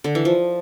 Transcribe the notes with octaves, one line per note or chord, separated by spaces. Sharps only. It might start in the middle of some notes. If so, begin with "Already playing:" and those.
D3
E3
F3